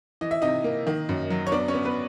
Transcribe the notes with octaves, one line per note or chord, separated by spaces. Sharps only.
E3 D#5
E5
C3 D#4 D#5
A#3
D#3
F#2
F#3
C#5
B3 D4 D5
C#4 C#5
B3
B3 B4